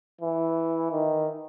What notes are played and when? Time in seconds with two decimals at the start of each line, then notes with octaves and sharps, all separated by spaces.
0.21 E3
0.92 D#3